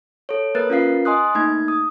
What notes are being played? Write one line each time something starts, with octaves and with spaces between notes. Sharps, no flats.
A4 C#5
A#3 A#4 B4 F#6 A6
C#4 F4 A#4 F5 C7
D#5 G#5 C6 D#6 F#6
A3 A#3 D#4 G#6
D#6